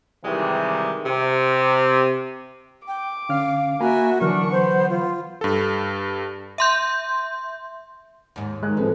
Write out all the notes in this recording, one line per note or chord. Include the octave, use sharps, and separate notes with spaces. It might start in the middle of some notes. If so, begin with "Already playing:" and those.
C3 D#3 E3 G3 G#3
C3
G5 D6
D3 C#4 F5 F6
A#3 F#4 E5 G#5 A#5 B5
D3 E3 F#3 D4 A#4 C#6
B3 C5
F4
G2 A4
E5 C6 G6
D#2 G#2
D#3 G#3 F#6
A2 F3 C4 A4 B4